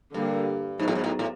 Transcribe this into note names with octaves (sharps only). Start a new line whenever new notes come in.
G2 D3 G3 A#3
G#2 F#3 B3 D#4 G#4
A2
G#2
A2
A2